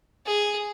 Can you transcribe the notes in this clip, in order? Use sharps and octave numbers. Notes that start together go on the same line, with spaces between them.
G#4